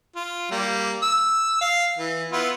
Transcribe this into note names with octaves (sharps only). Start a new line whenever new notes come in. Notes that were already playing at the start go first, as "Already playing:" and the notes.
F4
G3 A#3
E6
F5
E3
B3 E4 F4